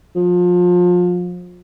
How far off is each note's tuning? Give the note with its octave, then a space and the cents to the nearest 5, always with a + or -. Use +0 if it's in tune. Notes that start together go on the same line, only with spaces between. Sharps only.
F3 +30